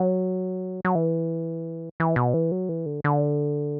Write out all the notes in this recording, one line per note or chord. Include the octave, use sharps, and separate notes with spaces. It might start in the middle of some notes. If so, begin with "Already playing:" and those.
Already playing: F#3
F#3
E3
E3
B2
E3
F#3
E3
D3
D3